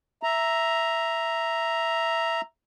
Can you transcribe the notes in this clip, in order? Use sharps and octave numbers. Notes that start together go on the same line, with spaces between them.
E5 A#5